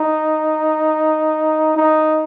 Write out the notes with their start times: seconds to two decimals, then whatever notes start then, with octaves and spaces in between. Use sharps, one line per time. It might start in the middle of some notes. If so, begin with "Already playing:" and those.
Already playing: D#4
1.76 D#4